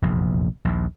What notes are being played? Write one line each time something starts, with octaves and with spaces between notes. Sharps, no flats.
F1 A#1 E2
A#1 D#2